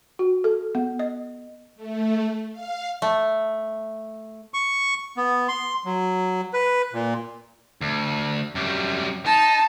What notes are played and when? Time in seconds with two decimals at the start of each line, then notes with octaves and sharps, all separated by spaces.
0.19 F#4
0.44 A4
0.75 B3
0.99 D#5
1.76 A3
2.52 F5
3.02 A3
4.54 C#6
5.17 B3
5.48 C6
5.85 F#3
6.53 B4
6.93 A#2
7.81 D2
8.55 F#2 G3
9.26 D#4 A5